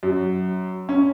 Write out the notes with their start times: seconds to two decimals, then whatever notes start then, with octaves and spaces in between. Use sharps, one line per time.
0.03 F#2
0.89 C#4